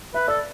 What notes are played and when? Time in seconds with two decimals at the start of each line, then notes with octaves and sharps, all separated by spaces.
0.14 B4 E5
0.28 A4 D5